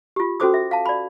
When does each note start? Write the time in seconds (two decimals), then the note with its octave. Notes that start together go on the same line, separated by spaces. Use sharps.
0.16 F4 G4
0.40 C#4 F#4 A4 C5 D6 D#6
0.54 E5
0.71 F5 A5
0.86 D5 B5